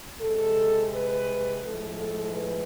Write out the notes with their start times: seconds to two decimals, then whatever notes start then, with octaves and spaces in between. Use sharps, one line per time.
0.21 C3 G#3 A4
0.92 B4
1.63 A2 F3 G#3 A4
1.98 A4
2.34 B4